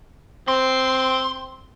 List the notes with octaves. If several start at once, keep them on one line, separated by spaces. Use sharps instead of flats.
C4 C6